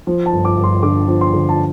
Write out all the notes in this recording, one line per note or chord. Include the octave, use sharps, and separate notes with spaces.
F3
A5
G1
D6
G1
C6
D3 D6
F3
C6
D3
A5